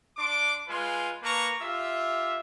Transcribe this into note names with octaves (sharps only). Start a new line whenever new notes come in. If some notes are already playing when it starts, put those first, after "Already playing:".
D4 C6 D6
G#3 F4 B4 G#5 C6
A#3 B4 A5 A#5 C#6
F4 G4 E5